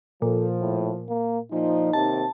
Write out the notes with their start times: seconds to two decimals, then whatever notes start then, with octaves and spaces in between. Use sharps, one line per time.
0.22 A#2 F3 A4
0.61 A2
1.09 A#3
1.52 A#2 F3 D#4
1.93 D#2 C3 D#3 A5